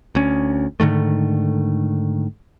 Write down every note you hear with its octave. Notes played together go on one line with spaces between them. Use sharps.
D2 C#4
G#2 D3 D#3 A3